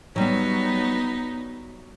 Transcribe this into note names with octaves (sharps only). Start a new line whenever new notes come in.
F#3 G3 B3 D#4